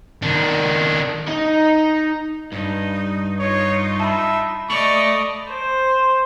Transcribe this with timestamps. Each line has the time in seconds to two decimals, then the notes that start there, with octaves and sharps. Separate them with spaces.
0.22 D#3 D4
1.27 D#4 D#5
2.52 G2 D#4
3.39 D#4 F4 C#5
4.00 E5 A5 B5
4.70 A3 D5 D#5 C#6 F7 F#7
5.50 C5